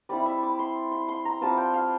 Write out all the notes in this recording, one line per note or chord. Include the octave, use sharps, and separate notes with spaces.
G3 C4 E4 D5
E5
D6
C6
C6
C6
A#5
G3 C4 F4 A5
G5
F5